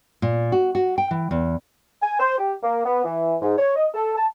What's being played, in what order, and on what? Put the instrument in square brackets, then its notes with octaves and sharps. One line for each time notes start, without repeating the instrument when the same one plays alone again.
[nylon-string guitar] A#2
F#4
F#4
G5
E3
E2
[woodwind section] G#5
C5
G4
A#3
B3
E3
G#2
C#5
D#5
A4
A5